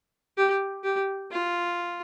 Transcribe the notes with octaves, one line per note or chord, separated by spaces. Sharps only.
G4
G4
F4